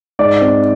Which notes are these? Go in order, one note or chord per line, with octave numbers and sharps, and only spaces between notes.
G#2 D5
C4